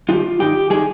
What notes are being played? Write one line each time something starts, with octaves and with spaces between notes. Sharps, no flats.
G2 D#3 G3 F4
G2 D#3 G3 G4
D#3 G3 G#4